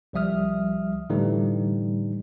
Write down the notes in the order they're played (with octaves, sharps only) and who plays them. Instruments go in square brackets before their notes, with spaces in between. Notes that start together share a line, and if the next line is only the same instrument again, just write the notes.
[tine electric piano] C2 F3 G3 E5 D#6 F6
A2 D3 E3 G3 A3 D#4